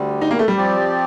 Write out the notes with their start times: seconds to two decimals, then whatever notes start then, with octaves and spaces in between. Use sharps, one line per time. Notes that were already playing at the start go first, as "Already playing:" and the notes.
Already playing: D2 D3 G3
0.21 D#4
0.31 A#3
0.39 A3
0.48 G3
0.56 F3 C4 G4 D5